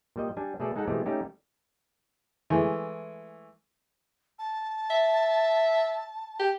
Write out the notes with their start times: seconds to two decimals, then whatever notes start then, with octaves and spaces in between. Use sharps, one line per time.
0.16 A#2 G3 D#5
0.37 G3 D4 G#5
0.60 B2 A3 G#4 A4 D5
0.76 G#3 D#4 A4 F#5
0.88 B2 E3 G#3 A3 C4 G4
1.06 G3 A3 C#4 D#4 G4
2.50 E3 G#3 A3
4.39 A5
4.90 E5
6.40 G4